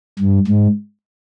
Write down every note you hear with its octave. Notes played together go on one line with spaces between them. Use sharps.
G2
G#2